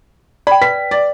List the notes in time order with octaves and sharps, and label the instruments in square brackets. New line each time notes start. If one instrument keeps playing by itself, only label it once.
[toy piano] D5 G5 [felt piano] B5
[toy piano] B4 [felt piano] B6
[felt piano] D5